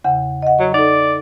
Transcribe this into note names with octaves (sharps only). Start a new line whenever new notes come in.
E2 C#3 F#5
D#5 F#5
F#3
D#4 A4 D5